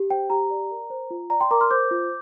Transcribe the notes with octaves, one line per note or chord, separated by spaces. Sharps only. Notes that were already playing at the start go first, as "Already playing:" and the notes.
Already playing: G4
C5 G5
G4 A#5
D5
A#4
C5
F4
D5 A#5
G5 C6
A#4 A#5 D6
C6 F6
C5 D6 G6
F4